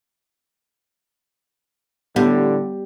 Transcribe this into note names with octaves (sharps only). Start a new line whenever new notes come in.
A2 D3 G3 B3